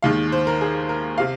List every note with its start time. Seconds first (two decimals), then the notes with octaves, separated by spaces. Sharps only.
0.02 D#2 D#3 G#3 F5
0.32 C5
0.47 A#4
0.61 G#4
0.89 A#4
1.18 C3 F5